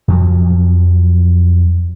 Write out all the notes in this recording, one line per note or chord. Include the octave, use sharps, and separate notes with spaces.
F2 F3 F#3